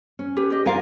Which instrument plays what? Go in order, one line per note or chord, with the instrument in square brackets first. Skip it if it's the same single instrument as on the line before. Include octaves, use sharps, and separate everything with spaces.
[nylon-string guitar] C#4
[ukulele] G4 B4
G4 D#5
[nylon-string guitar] D4 A#4 [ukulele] F4 F5 G#5